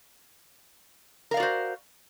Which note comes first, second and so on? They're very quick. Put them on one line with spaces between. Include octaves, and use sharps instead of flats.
A#4 F5 D5 F#4 C5